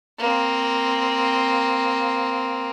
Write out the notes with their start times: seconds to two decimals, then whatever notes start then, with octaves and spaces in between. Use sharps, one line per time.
0.19 A#3 C4